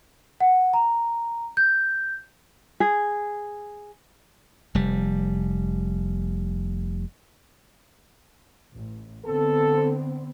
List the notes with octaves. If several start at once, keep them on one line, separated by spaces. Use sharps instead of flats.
F#5
A#5
G6
G#4
F1 G3
A1
D3 B3 C4 A4